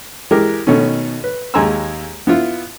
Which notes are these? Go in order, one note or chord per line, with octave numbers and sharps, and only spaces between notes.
E3 G#3 G4 A#4
B2 D#3 A3 C#4
B4
D#2 G#3 G#5 A#5 C6 E6
B3 E4 F4